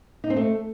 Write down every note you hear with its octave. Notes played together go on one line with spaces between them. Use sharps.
D#4
C4
A3